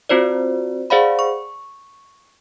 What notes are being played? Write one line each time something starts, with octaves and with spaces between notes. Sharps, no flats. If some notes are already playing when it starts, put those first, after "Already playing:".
C4 F4 F#4 C5 D5
G#4 C5 D5 F5 F#5 B5
C#6